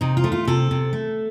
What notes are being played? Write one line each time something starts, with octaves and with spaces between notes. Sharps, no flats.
C3 D#4
F4
A3
F4
C3 A4
C3
A3